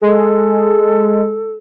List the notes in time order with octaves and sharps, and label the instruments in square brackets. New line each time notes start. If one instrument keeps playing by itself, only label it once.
[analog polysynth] G#3 [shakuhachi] A4